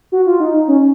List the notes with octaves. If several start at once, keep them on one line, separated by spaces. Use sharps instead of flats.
F#4
F4
D#4
D#4
C#4